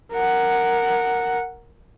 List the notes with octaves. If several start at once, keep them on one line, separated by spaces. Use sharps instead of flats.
A#4 F#5